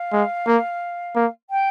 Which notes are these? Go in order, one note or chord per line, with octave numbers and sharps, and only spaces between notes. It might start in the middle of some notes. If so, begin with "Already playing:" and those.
Already playing: F5
G#3
A#3
A#3
G5